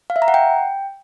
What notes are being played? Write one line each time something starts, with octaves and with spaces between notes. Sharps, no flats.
F5
E5
A#5
F#5
G5